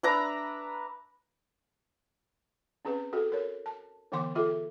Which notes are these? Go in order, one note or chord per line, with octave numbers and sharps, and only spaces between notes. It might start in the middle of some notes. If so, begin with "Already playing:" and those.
D4 B4 E5 A#5
C4 C#4 G#4 B4
F#4 G#4 A4
A#4 C#5
A5
D3 E3 B3 F#5 C6 D6
F4 G#4 A4 E5